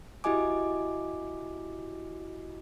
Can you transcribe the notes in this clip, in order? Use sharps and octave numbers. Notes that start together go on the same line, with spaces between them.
E4 F#4 G4 D#5 G#5 D6